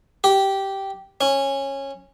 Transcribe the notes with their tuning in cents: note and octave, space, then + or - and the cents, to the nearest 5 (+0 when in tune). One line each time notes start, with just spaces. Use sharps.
G4 -10
C#4 -15